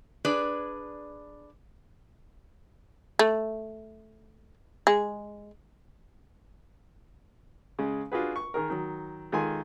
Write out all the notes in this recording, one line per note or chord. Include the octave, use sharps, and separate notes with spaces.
D4 G#4 B4 D5
A3
G#3
C#3 G#3
D4 F4 F#4 G#4 B4
C#6
D#3 G#4 A#4
D#3 F#3
D#3 G#3 F4 A4 G#5 C6